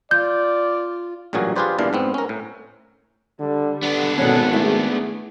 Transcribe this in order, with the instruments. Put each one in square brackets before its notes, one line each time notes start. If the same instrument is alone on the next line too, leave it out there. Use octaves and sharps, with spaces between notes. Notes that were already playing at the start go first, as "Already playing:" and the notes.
[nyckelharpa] F4 [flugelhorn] D5 [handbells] G6
[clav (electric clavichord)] A1 G2 A#2 F#3 F#4 G#4
F4 G4 G#4 B4 C5 D5
E2 G2 A#2 E3 D4 F5
G#2 B3 C4
C#4 A#4
A2
[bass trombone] D3 [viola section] G3
[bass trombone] D3 [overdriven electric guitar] B3 D4
[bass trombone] G#1 [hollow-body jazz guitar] B2 C#4 [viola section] A4 F#5
[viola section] A3 G#4 [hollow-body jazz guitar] E4